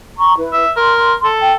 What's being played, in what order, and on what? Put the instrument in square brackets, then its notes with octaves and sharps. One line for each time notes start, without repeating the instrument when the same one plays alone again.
[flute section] A#5 C#6
E4 B4
[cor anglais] E5
[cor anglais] A#4 [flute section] C6
[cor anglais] A4
[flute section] G5